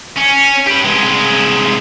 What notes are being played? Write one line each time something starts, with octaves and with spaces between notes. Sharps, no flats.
C#4
G4 B4
C2 G#3